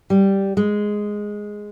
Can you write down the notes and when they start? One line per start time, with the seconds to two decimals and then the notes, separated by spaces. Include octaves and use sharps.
0.10 G3
0.57 G#3